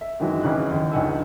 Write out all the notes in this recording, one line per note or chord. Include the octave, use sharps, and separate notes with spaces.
E5
F#2 D#3 E3 F#3 G#3
G#1 C#3 E3 F#6
D#2
C#2 D4 D#4 F#5 G#5 E6